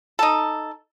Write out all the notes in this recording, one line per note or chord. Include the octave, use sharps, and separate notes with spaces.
D#4 A4